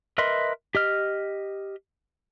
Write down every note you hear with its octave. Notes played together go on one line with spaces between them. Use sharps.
A#4 B4 D#5 E5 C6
G4 D#5 F6